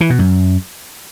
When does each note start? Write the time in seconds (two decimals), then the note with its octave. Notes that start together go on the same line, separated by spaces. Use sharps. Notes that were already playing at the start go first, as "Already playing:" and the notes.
0.01 E3
0.10 B2
0.19 F#2